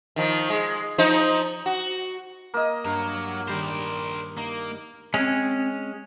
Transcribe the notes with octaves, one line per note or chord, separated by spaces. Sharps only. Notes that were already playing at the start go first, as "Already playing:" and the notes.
D#3 F3
G#3
F3 D#4 C5
F#4
A#3 D#5
G2 F#3 C#5 F5 A#5
D#3 G3 A#4 C5 A#5
A#3 D#4
G#3 C4 C#4